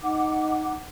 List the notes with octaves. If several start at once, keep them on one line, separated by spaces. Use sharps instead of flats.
D#4 F#5 D6